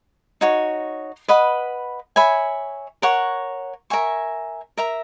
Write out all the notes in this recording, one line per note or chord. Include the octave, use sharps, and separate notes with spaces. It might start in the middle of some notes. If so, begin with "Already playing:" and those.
D#4 F#4 C#5
B4 D#5 F#5 B5
C#5 E5 G#5 B5
A#4 C#5 F#5 C#6
A#4 E5 G#5 C#6
A#4 E5 A#5